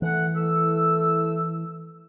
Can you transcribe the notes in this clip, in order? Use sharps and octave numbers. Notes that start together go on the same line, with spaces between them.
E3 A3 F#5
A3 E4 E6